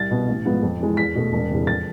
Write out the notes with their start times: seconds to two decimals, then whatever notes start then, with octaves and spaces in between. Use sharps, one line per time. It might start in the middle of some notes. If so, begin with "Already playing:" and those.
Already playing: C2 A6
0.11 B2 B3
0.28 A1
0.45 G#2 F3 B3
0.63 F2
0.80 E3 G#3
0.97 E2 B6
1.15 B2 A3
1.33 E1
1.50 E2 C3
1.67 F2 A6